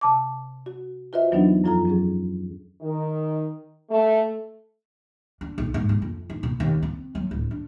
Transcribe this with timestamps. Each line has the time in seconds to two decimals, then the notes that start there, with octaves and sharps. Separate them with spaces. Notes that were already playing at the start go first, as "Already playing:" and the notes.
0.01 C3 A5 D6
0.66 F#4
1.13 F4 F#4 B4 C5 D#5 E5
1.31 E2 E3 F#3 B3 D4 D#4
1.64 F#2 F3 F4 A4 A#5
1.85 F#3 C#4 G#4
2.81 D#3
3.90 A3
5.41 D4
5.58 B1
5.74 G#2
5.89 B1
6.02 F2
6.30 D#4
6.43 B2
6.60 D#2
6.83 C4
7.15 F#3
7.31 D1
7.51 D4